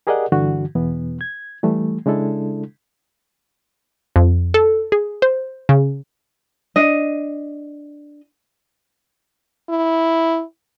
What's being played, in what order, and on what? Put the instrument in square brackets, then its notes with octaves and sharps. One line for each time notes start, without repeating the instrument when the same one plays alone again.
[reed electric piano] G4 G#4 A#4 D5 D#5 F#5
G2 D3 E3 F#4
E2 B2 E3 B3
G#6
E3 G3 A3
C#3 G#3 D4 E4 A4
[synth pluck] F2
A4
G#4
C5
C#3
[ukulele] D4 D#5
[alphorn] E4